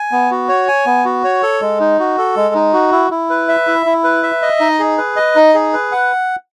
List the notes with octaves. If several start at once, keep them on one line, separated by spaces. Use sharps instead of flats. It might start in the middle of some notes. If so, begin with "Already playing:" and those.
Already playing: G#5
B3
F#4
C#5
G#5
B3
F#4
C#5
A4
G#3
D#4
F#4
A4
G#3
D#4
F#4
E4
E4
B4
E5
E4
E4
B4
E5
D#5
D#4
G#4
B4
D#5
D#4
G#4
B4
F#5